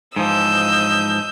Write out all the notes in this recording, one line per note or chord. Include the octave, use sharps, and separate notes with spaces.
G#2 E3 F3 D#5 E6 G6